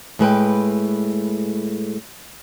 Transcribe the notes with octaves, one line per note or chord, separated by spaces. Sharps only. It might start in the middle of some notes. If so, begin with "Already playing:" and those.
A2 G#3 B4 G5